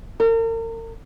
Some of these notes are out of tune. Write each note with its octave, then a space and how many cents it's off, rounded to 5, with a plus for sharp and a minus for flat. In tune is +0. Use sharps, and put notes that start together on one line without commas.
A#4 -40